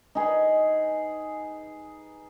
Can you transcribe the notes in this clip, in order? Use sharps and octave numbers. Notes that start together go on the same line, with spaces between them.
D#4 G#4 B4